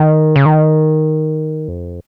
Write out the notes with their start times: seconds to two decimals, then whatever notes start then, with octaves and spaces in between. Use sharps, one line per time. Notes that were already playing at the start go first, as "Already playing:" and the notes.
Already playing: D#3
0.36 C#3
0.46 D#3
1.68 F2